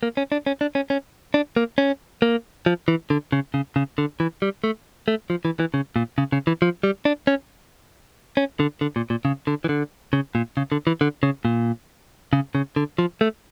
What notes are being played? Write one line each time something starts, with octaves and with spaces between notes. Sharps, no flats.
A#3
C#4
D4
C#4
D4
C#4
C#4
D4
A#3
C#4
A#3
F3
E3
D3
C#3
C#3
C#3
D3
E3
G3
A3
A3
F3
E3
E3
C#3
A#2
C#3
C#3
E3
F3
G3
D4
C#4
C#4
D3
D3
A#2
A#2
C#3
D3
E3
D3
C#3
A#2
C#3
D3
E3
D3
C#3
A#2
C#3
C#3
D3
F3
A3